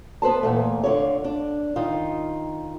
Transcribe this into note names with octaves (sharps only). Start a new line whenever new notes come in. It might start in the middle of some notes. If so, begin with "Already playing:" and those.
B3 B4 C5 A5
E2 A#2 A3
D3 F4 C#5
D4
D#3 D#4 F4